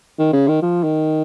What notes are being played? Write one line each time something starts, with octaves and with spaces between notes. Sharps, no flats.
D#3
C#3
D#3
F3
D#3